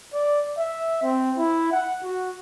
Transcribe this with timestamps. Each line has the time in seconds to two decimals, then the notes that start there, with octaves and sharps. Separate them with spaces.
0.13 D5
0.58 E5
1.03 C4
1.37 E4
1.72 F#5
2.04 F#4